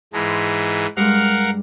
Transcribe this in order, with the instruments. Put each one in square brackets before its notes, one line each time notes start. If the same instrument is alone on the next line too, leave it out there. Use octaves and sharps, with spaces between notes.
[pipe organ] G#2 E3 G#3 [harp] A5 B5 C6
[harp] G2 G#3 [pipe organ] A#4 F5 F#5